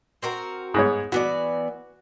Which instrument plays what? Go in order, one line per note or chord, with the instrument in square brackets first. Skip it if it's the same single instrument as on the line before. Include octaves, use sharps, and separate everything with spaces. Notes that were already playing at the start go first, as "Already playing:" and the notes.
[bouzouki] C4 F#4 A#4
[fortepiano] G#2 B3 C#5
[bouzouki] E3 B3 D5 [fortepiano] F#4